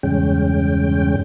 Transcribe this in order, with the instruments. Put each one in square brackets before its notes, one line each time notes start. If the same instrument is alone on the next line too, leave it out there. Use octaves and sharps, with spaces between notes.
[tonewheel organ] E2 G2 C#3 G#3 C#4 G5